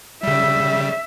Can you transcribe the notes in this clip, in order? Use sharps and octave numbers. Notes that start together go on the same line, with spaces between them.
C#3 G3 E5